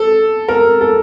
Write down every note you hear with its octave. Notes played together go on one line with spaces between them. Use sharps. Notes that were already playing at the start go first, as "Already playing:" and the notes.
Already playing: A4
A#4
A4